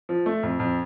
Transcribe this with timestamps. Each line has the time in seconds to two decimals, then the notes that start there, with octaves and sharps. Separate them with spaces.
0.09 F3
0.26 A3
0.43 F2
0.60 F2